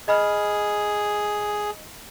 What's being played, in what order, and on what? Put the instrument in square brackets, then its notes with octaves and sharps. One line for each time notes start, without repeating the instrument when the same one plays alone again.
[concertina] G#4 [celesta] D#5 B5 F6